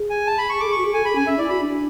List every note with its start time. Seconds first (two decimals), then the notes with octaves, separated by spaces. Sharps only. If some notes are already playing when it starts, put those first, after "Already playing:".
Already playing: G#4
0.10 G#5
0.27 A5
0.38 B5
0.50 C#6
0.60 A4 D6
0.69 G#4 C#6
0.78 F#4
0.85 G#4
0.94 A4 G#5
1.05 G#4 B5
1.16 C#4 G#5
1.27 C#4 E5
1.38 E4 D5
1.49 F#4 B5
1.61 D4